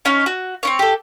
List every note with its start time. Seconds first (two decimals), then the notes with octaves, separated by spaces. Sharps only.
0.05 C#4 D#4 C#5
0.26 F#4
0.63 C4 C#4 C#5
0.79 G4 A4